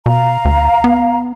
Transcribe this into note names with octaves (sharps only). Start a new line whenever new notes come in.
B2 F5 A#5
D2
B3